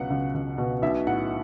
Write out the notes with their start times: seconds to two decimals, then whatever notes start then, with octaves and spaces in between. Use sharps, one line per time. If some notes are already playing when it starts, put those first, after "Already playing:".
Already playing: C#2 B2 F#3 F#5
0.10 C#2
0.34 C#2
0.58 B2
0.82 B1 E5
1.07 A2 F#5